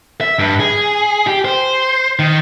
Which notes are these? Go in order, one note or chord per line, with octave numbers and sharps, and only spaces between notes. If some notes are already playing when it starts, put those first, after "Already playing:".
E5
G2
G#4
G4
C5
D#3